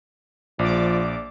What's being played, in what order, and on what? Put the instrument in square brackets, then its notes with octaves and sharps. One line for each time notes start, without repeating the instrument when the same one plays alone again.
[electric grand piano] A#1 [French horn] F3 [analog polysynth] D5 D6